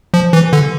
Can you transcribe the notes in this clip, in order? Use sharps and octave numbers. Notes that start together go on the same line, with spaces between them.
F3
E3
D3